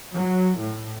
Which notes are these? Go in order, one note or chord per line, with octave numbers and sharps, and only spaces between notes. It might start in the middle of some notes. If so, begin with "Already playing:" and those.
F#3
A2